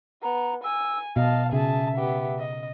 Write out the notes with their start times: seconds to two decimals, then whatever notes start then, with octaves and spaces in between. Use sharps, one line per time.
0.23 B3 A#5
0.64 G#5 E6
1.16 B2 D#5 F5 A5
1.52 C#3 G#4 E5 A5
1.97 B3 G4
2.39 D#5